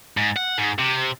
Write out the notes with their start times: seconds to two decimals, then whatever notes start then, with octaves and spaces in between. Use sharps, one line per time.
0.17 G#2
0.36 F#5
0.58 G#2
0.79 C3